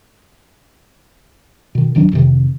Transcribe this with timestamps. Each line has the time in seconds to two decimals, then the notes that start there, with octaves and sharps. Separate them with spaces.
1.75 B2 D#3
1.95 D1 D#3 F#3 D4
2.13 F2 C3 D#3